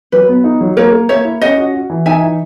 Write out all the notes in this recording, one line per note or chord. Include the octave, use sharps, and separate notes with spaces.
F#3 B4
B3
D#4
F#3
A#3 A#4 C#5
A#3
A#3 C#5 E5
E4
C#4 D#5 F#5
F#4
F#4
E3
D#4 E5 G#5
E3